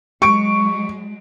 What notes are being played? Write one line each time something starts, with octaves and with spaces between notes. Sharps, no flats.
F#3 G#3 C#6 D7